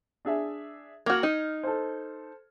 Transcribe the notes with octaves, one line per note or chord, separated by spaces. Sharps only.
D4 G#4 E5
A#3 F#4 F6 G#6
D#4
A4 C5